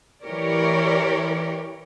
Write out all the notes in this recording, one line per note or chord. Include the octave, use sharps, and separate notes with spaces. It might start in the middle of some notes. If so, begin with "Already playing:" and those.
E3 G4 A#4 C#5 D5